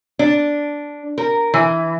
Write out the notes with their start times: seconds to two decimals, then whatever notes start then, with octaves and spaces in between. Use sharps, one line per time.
0.19 D4
1.18 A#4
1.54 E3